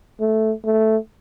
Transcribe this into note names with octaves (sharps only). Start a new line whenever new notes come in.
A3
A3